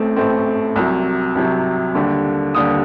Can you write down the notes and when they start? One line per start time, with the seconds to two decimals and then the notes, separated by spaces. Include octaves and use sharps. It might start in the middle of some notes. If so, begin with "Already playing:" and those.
Already playing: A1 A2 A3 C4
0.16 A1 A2 A3 C4
0.76 C2 C3 F#3
1.35 C2 C3 F#3
1.95 D#2 D3 G3
2.55 D#2 D3 G3 D#6